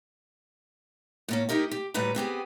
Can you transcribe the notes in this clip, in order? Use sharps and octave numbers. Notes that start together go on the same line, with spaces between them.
A2 A#3 C#4
D#4 E4 G4 A#4 D#5
G4
D2 A2 G3 B4 A#5
B3 C4 G4 G#4